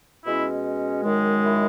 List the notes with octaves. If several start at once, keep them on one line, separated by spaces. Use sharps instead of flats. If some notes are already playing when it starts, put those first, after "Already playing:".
B2 G#3 C#4 E4
F#2 D#3 G#3
E4